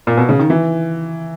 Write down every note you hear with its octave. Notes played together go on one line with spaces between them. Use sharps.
A#2
B2
C#3
D#3
E3